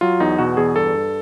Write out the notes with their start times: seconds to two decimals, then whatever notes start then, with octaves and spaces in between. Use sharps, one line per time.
0.01 F#3 F4
0.20 E2 D#4
0.38 B2 F#4
0.57 E2 G#4
0.75 G2 A4
0.94 G2